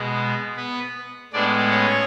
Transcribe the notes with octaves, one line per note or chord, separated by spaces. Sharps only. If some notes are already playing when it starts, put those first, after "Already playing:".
Already playing: B2 G#3 B3
B3 B4
A2 G#3 B3 D4 D5
C#4 C#5